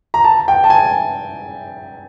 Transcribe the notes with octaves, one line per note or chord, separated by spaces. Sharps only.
A#5
A5
G5
A5
G#5